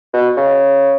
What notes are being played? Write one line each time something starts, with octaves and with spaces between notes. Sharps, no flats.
B2
C#3